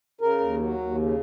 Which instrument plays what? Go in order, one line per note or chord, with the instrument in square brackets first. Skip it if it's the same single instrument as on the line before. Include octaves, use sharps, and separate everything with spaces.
[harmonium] C#3 A#4
D#2
F#3
D#2
C#3